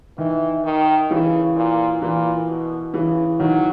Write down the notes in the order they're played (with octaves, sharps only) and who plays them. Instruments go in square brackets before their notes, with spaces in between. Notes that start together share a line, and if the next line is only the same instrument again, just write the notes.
[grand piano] D#3 [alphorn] E3
[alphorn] D#3
[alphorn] C#3 [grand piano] E3
[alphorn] A#2
[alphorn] A#2 [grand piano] E3
[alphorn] B2
[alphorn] C#3 [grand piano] E3
[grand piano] D#3 [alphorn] F#3